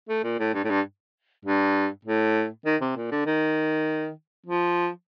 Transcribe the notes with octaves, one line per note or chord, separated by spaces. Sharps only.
A3
A#2
A2
G2
A2
G2
G2
A2
D#3
C3
A#2
D3
D#3
F3